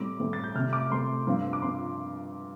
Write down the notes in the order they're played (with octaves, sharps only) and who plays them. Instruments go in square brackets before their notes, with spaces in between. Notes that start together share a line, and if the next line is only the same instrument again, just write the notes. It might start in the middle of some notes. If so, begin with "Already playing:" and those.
Already playing: [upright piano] A2 G3 C4 D6
A2 G3 C4
A6
G6
C3 A3 C4 F6
D6
C3 A3 C4 C6
G2 F3 C4
D6
F3 C4 C6